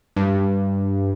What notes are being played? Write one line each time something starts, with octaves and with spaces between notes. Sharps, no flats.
G2